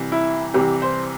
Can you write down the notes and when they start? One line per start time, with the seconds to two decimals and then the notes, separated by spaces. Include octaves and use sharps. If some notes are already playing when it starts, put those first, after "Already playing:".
Already playing: C2 C3 E3
0.12 E4
0.53 C2 C3 E3 G4
0.82 C5